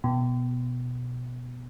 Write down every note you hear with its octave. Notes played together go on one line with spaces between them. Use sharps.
B2